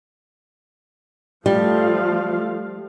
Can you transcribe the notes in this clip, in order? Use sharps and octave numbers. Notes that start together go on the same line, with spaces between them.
F3 G3 A3 F5